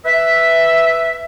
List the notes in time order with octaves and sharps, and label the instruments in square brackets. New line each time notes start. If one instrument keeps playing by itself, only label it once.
[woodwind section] B4 E5